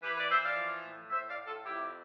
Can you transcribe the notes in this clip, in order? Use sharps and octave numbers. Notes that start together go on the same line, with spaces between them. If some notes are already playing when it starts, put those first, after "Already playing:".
E3 G4 B4
B4 D5
E3 C5 E5
D5 F5
F3
A2
A2 C5 E5
D5 F5
A2
F4 A4
F2 E4 G4